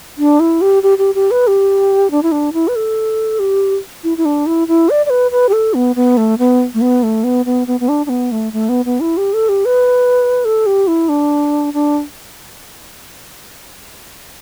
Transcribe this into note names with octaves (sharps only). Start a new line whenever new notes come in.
D4
E4
G4
G4
G4
G4
B4
G4
D4
E4
D4
E4
B4
A4
G4
E4
E4
D4
E4
E4
D5
D5
B4
B4
G4
A4
B3
B3
A3
B3
A3
B3
A3
B3
B3
B3
B3
D4
D4
B3
A3
A3
B3
B3
E4
G4
A4
G4
B4
A4
G4
E4
D4
D4